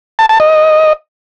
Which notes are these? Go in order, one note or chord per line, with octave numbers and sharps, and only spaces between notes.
A5
A5
D#5